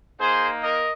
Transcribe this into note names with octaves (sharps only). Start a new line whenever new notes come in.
A#3 D#4 G#4 C5
A#4 D#5